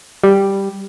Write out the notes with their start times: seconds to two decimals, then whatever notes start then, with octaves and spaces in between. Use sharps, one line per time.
0.23 G3